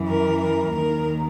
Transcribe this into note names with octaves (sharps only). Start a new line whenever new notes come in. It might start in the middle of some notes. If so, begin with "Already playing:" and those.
Already playing: F#2 E3
A#4
A#4
D#2 D#3 A#4